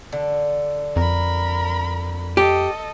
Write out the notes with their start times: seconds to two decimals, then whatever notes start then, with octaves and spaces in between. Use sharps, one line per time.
0.12 D3
0.96 F2 A#4 B5
2.37 G4 A4 D#5